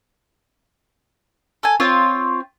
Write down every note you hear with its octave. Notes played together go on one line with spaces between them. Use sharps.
A4 G#5
C4 F4 C#5